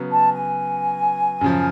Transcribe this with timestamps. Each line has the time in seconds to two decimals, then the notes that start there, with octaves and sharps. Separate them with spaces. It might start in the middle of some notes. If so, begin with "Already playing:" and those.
Already playing: C#3 F#3 B3
0.11 A5
0.33 G#5
1.41 F#2 C#3 F3